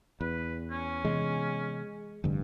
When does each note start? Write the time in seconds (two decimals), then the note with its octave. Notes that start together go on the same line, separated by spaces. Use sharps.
0.21 E2 B4
0.72 C#4
1.05 C3 E3 G#3 B3
2.24 F1 G2 D3